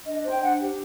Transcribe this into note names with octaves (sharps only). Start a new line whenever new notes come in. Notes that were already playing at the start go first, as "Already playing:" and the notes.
D4 D#5
C5
G5
D4 F#5
G4